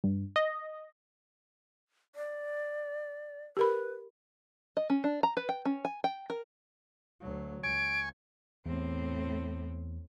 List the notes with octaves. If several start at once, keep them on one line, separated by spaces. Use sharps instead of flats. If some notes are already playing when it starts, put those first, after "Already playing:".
G2
D#5
D5
G4 A#4 B4 B5
D#5
C#4
D4
A#5
B4
G5
C#4
G#5
G5
A#4
D2 F#3
C#2 G#5 C#6 D7
E2 A2 C4